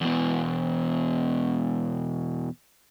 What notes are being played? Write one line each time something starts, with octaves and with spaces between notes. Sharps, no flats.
E2 B2